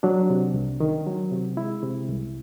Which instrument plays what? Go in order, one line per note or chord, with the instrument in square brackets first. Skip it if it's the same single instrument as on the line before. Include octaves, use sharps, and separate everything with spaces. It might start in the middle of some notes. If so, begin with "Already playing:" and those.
[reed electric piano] F#3 D4
C3
C2
D#3
F#3
C3
G#3 E4
C3
C2